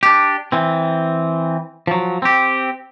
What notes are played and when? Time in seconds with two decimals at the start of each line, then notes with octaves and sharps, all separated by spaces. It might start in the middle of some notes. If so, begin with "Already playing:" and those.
0.03 D4 G4
0.52 E3 C4
1.87 F3 F#3
2.22 C4 G4